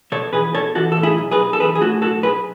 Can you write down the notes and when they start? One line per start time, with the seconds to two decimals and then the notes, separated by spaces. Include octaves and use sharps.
0.12 B2 A4 C#5
0.33 E2 G#4 B4
0.54 B2 A4 C#5
0.75 E3 F#4 A4
0.92 A4
0.97 A2
1.03 E4 G#4
1.18 B1
1.31 G#4 B4
1.39 B1
1.53 A4
1.60 E3 G#4 B4
1.75 G#4
1.81 A2 F#4 A4
2.02 B1 F#4 A4
2.23 B1 G#4 B4